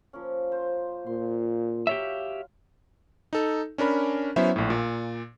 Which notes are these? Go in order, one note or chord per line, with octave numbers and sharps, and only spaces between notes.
F3 A#3 C#4
C5
A#2 C6
F#3 G4 C#5 E5 F5
D#4 A4
C#4 D4 A#4 B5
F#3 B3 C#4 E4 C5 E5
A#1 A2
A#2